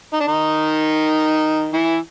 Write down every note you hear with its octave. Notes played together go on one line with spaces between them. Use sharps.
D#4
D4
D#3 D#4
E3 E4